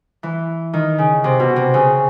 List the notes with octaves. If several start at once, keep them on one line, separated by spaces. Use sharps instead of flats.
E3
D#3
C#3
C3
B2
C3
C#3